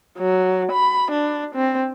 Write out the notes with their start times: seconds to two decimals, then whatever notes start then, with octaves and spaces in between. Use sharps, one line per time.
0.18 F#3
0.72 B5
1.12 D4
1.56 C4